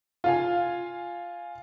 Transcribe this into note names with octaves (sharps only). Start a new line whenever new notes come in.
F4 F5 G#5